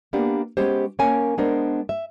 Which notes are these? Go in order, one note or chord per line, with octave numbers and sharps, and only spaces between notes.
A#3 B3 D4 G4
G#3 B3 C#4 G4 C5
A#3 C#4 A#4 C#5 G#5
G#3 B3 D4 A#4 C5
E5